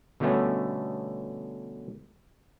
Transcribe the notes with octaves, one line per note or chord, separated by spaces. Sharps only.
B2 D3 G3 A3 B3 C#4